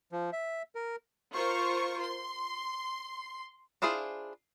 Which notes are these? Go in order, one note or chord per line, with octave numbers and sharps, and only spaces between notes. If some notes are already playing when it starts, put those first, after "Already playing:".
F3
E5
A#4
F4 A#4 C5 C#6
C6
D4 E4 F4 G#4 C5